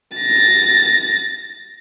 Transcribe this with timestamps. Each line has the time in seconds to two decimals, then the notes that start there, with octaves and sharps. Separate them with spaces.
0.17 A6 A#6